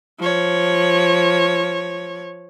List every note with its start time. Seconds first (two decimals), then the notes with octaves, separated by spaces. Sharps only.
0.19 F3 C#5